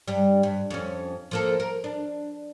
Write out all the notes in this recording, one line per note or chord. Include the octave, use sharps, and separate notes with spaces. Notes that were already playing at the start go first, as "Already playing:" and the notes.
G2 G3
G2
F2 C#4
F3 A#3 A4
A#4
D4